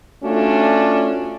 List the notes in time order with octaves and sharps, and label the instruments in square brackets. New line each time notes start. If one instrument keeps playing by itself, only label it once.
[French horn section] A3 C#4 D4 F4 F#4